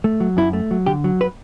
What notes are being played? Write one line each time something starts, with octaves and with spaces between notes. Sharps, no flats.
A3
F#3
F#2 E4
A3
F#3
D3 G4
F#3
B4